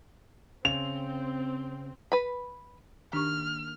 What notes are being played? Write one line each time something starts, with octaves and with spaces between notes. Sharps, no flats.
C#3 C4 F7
B4 B5
D#3 A#3 D4 G4 C#6 F6